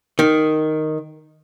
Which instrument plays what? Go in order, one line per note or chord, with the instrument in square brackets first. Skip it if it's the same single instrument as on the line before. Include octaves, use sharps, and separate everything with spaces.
[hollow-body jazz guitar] D#3